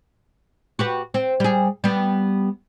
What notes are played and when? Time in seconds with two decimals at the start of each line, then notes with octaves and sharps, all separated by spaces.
0.79 F#4 G4 B4
1.14 C4
1.40 G3 G#4
1.84 G3 B3